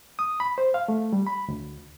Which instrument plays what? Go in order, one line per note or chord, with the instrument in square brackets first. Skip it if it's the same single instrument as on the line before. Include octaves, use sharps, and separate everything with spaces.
[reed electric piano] D#6
B5
C5
F5
A3
G3
B5
D2